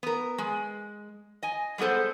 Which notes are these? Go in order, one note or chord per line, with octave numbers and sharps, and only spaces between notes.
B3 A#4
G#3
D#5 G#5
G3 G#3 B3 A4 C5